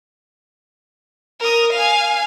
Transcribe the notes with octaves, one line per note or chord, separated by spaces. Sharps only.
A#4 D#6
F5 G#5